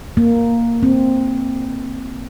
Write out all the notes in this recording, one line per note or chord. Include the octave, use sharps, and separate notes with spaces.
A#3
C4